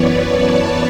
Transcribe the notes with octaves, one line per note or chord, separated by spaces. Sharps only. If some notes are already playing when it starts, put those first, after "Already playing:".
Already playing: F#2 E3 B3 B4 C#5 D5
A5